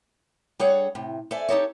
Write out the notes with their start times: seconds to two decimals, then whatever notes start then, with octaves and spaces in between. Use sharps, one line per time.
0.59 G3 D4 G#4 A4 C#5 F#5
0.95 A2 C3
1.31 A4 C5 D5 E5 G#5
1.49 D#4 G4 A4 C#5